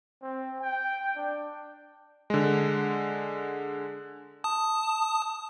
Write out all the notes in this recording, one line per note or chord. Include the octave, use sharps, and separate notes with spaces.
C4
G5
D4
D3 G#3
A5 D#6